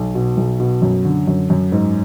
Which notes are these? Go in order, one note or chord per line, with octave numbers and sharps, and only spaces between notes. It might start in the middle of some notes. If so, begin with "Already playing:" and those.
Already playing: B1
B2
B1
B2
F#2
D3
F#2
F#2
G#2